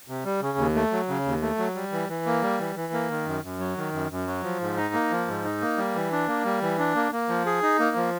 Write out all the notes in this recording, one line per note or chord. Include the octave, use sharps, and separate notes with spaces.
C3
G3
C#3
D#2
A3
F#3
C#3
D#2
A3
F#3
G3
E3
E3
A#3
G3
E3
E3
A#3
D#3
F#2
F#2
F#3
D#3
F#2
F#2
F#3
F3
G#2
D#4
A#3
F3
G#2
D#4
A#3
G3
E3
D4
A#3
G3
E3
D4
A#3
A#3
F3
G#4
D#4
A#3
F3